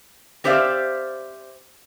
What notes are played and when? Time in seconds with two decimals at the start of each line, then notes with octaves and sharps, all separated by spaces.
0.44 C4 G4 C5 D5 E5 F5